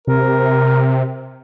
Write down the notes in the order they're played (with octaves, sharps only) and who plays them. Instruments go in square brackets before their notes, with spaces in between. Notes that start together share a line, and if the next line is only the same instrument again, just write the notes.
[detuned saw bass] C3 [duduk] A#4